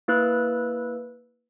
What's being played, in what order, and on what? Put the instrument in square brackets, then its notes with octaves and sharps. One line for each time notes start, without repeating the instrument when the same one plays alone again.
[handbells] A#3 E4 B4 E6 F#6